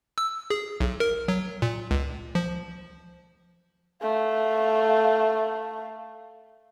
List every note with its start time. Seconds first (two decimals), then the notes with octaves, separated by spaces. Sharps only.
0.18 E6
0.50 G#4
0.81 B1
1.00 A#4
1.28 F#3
1.62 A#2
1.91 C#2
2.35 F3
4.02 A3 F5